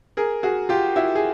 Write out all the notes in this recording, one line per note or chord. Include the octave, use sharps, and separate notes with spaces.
G#4 A#4
F#4 G#4
F4 G4
E4 F#4
G#4